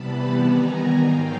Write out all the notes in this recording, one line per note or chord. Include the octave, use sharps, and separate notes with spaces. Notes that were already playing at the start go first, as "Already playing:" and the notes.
Already playing: C3 E3 G3 B3 A5 B5
D#3 G3 B3 G#5 A#5
G#2 D#3 F#3 F5 G5